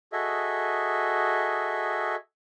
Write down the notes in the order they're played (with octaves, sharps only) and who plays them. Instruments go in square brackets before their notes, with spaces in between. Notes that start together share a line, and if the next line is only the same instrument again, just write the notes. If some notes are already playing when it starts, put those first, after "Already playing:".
[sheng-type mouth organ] F#4 G#4 A4 D#5 E5